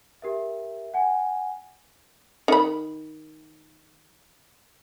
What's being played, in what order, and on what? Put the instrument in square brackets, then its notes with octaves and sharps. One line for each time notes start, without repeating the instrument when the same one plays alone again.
[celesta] G4 A#4 E5
F#5 G#5
[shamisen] D#3 B5